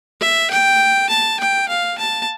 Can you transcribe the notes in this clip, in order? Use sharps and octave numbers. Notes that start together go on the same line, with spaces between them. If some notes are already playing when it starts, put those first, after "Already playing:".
E5
G5
A5
G5
F5
A5